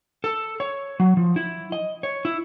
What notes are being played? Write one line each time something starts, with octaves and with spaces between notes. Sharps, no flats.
A4
C#5
F#3
F3
E4
D#5
C#5
E4